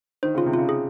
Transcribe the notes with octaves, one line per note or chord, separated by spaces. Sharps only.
D#3 C5
C#3 F4
C3
F4
C#3
G#4